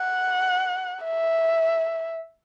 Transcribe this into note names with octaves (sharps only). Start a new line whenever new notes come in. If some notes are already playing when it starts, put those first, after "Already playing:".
Already playing: F#5
E5